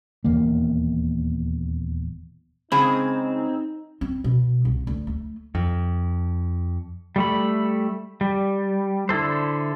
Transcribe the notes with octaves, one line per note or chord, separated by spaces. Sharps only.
D#1 E2 D#3 A#3
C#3 G#3 C4 D#4 G#4 B5
C4
B2
C2
D2
A3
F2
G3 A3 B5
G3
D3 E4 A4 C5